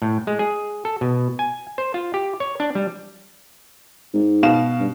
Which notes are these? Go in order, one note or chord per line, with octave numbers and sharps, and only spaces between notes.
A2
G#3
G#4
A4
B2
G#5
C5
F4
G4
C#5
D4
G3
G#2
B2 F5 E7
G2